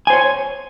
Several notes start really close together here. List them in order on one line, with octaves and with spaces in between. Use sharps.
G#5 C5 C#5